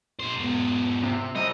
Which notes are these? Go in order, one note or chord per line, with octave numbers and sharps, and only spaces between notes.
A#2 C5
G#2 B2
C3
G3 C4 D#5